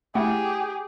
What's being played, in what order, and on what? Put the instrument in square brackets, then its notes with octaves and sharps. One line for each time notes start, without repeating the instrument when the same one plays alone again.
[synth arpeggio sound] A3 E4 F#5 [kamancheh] G4 G#4